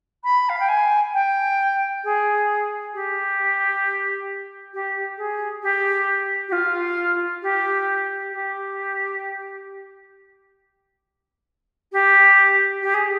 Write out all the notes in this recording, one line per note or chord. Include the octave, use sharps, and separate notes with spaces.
B5
F5
G5
G#5
G5
G#4
G4
G4
G#4
G4
G4
F4
G4
G4
G4
G4
G#4